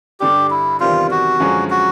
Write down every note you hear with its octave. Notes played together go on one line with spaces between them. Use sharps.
G2 D3 G3 G4
E4
E2 C3 D#3 G3 C4 F4
F#4
F#2 D3 F3 G#3 C#4
F#4